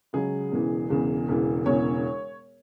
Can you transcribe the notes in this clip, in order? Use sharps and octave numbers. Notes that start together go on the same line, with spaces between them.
C#2 C#3 F#3 G#4
E1 E2 C#3 E3
E1 E2 C#3 E3
E1 E2 C#3 E3
E1 E2 C#3 E3 C#5